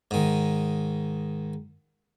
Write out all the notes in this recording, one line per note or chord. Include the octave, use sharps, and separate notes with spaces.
G#2 D#3